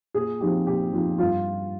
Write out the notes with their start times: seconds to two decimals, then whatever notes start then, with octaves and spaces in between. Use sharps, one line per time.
0.15 A#2 G#4
0.40 F3 C4 D#4 G4
0.66 A#2 G4
0.92 F3 C4 D#4 F4
1.18 G2 F4